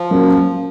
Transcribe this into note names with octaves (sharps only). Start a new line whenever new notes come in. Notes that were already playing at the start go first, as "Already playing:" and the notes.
Already playing: F3
F#3 A#3 C#4